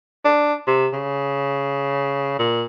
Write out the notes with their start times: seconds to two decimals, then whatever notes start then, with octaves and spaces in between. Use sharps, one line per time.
0.25 D4
0.67 C3
0.93 C#3
2.39 A#2